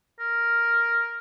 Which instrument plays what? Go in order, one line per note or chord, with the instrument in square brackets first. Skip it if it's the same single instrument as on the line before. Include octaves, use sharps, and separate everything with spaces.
[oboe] A#4